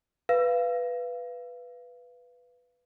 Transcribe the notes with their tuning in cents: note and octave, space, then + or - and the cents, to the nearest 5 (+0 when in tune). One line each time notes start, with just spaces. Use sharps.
B4 +0 F5 -20